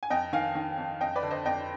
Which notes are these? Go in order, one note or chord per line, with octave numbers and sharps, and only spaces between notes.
G#5
F2 D#5 G5
D#3 F5 G#5
D#3
F2
F2 D#5 G5
B4 D5
D3
C5 D#5
F2 D#5 G5